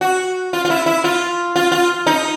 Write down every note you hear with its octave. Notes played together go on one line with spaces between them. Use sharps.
F#4
F4
F4
E4
E4
F4
F4
F4
D#4